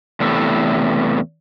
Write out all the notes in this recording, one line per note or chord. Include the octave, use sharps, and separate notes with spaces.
E2 A2 C3 A3